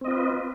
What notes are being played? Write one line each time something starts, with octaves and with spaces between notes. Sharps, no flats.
C4 F4 B4 D#5